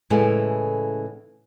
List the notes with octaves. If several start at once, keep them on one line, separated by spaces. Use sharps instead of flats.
A2 C#3 E3 G#3 A3 E4